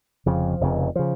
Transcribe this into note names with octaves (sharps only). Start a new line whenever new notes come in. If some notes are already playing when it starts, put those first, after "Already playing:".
F1 F2 C#3 F3
F1 F2 C#3
C#3 F3